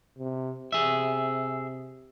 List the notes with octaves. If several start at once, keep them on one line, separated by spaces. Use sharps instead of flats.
C3
C3 G#4 E5